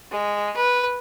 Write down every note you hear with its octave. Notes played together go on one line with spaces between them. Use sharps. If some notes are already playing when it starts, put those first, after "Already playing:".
G#3
B4